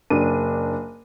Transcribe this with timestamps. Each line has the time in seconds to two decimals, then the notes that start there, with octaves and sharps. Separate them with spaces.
0.10 F#1 D4 D#7